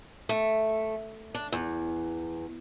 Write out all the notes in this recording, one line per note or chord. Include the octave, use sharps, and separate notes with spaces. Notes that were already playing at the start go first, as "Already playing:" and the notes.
A3
D4
E2